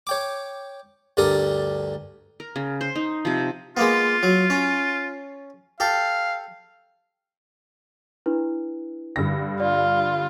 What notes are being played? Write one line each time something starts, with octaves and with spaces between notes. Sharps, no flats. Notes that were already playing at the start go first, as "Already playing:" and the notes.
C#5 G5 D6
D2 G2 G3 A4 A#4 D#6
A#4
C#3
C5
D#4
C3 F3
G#3 A#3 B3 F4
F#3
C#4
G4 A4 F5
D4 E4 B4
G2 D3 A#6
F4 D5